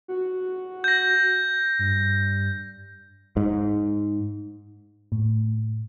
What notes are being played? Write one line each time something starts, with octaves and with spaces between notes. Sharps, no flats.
F#4
G6 A#6
G2
G#2
A2